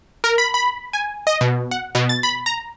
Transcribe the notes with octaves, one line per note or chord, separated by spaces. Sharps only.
A#4
B5
B5
G#5
D#5
B2
F#5
B2
A6
B5
A#5